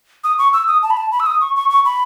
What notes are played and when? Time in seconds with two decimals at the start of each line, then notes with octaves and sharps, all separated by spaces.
0.24 D#6
0.38 C#6
0.53 E6
0.68 D#6
0.83 A5
0.90 B5
0.97 A5
1.12 B5
1.20 E6
1.26 D#6
1.41 C#6
1.56 C#6
1.70 C#6
1.85 B5